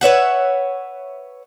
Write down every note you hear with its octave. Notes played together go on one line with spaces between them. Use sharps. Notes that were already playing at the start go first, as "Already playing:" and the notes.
B4 C#5 E5 F#5